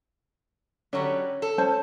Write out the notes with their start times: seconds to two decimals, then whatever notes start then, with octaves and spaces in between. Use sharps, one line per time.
0.93 D3 F#3 G3 C#4
1.42 A4
1.58 C#4 C5 A5